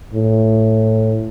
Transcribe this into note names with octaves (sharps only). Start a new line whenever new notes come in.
A2